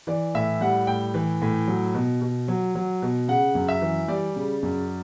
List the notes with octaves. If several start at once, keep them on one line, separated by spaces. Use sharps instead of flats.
E3 D5
A2 E5
G3 F#5
A2 G5
E3
A2
F#3
B2
B2
F#3
F#3
B2
C#3 F#5
F#2
E5
E3
G3 D5
C#3
F#2